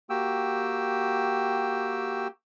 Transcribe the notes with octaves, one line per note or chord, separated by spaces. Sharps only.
A#3 F#4 G4 G5 E6